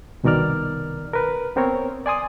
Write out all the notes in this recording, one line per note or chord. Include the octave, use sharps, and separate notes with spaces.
C2 B2 D#3 A#4 D5 F6
A#4 B4
B3 C4 A#4 C#5
D5 G#5 C6 D#6